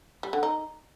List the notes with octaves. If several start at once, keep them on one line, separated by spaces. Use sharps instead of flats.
G3
D3
D#4